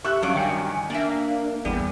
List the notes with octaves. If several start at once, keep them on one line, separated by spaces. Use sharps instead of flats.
G4 E5 C#6 F#6
G2 F#3 C#4 D5 F5
D#3 G5 G#5 C#7
A#3 D4 D5 E5
G#1 E2 G3